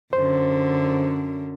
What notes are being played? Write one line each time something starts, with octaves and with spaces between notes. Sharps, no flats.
F#2 D3 C5